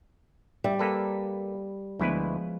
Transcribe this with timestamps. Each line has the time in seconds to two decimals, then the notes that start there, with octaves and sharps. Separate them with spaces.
0.64 G3 E5
0.79 A#3 A4 B4 D5 B5 B6
2.00 D2 F3 G#3 B3 E4 B4